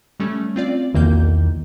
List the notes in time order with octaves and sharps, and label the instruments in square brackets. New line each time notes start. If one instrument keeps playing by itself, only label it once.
[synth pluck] G3 A3 C#4
C4 F4 D5
[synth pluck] B1 A#3 G6 [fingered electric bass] E2 D#3